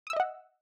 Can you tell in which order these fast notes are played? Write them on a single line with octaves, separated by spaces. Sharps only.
D#6 E6 E5 D#5 F#5